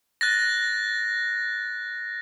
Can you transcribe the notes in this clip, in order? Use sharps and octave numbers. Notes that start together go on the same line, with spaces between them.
F#6 A6 A#6